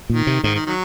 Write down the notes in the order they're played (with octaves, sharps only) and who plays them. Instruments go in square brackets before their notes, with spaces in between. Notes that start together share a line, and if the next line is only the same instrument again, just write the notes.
[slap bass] A#2 [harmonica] D#3
[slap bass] C3
[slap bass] G#2 [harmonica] D#3
[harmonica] D#3
D#3 F#3